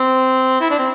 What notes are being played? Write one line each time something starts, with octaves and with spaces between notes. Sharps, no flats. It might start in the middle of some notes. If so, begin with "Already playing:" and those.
Already playing: C4
E4
D4
C4